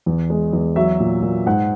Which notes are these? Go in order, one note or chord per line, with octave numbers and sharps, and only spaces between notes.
E2
G#3
E2
F#3 E5
A#2
A#2
G#2 F#5